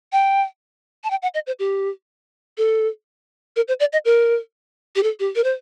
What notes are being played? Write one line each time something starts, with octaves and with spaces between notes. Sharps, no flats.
G5
A5
G5
F#5
D#5
C5
G4
A4
A#4
C5
D5
D#5
A#4
G4
A4
G4
A#4
C5